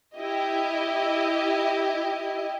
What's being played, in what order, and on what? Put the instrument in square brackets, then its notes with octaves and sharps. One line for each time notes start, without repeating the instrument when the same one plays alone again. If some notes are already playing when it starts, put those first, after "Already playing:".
[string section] E4 G4 D#5